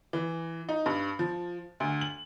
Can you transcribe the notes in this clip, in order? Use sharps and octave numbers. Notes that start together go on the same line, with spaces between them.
E3
D#4
G2
F3
D2
F#7